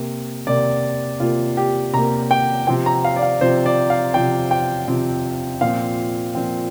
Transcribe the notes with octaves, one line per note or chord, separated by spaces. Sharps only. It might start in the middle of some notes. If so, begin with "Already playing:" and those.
Already playing: C3 A#3
C3 A#3 D5
C3 A#3 F4
G4
C3 A#3 A#5
G5
C3 F3 C4 G5
A#5
F5
D5
F5
C3 F3 C4 C5
D5
F5
C3 F3 C4 G5
G5
C3 F3 C4
A#2 F3 C4 F5
A#2 F3 C4